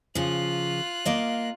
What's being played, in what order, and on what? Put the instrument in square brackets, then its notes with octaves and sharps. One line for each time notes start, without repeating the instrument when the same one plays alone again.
[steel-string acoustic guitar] C#3 F3 [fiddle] F4 F#6
[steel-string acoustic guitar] A#3 D#5 F5